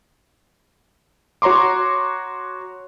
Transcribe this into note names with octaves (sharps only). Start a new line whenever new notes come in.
F#4 C#5 A#5 C6 D6